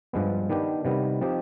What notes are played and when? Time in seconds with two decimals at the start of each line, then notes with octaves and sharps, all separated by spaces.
0.13 G2 F3 G#3 B3
0.50 D#3 B3 D4 G4
0.85 C3 D#3 G3 B3
1.21 F3 C4 D#4 G4